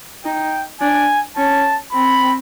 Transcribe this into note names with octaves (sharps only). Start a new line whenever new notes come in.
D#4 G5
D4 G#5
C#4 A5
C4 B5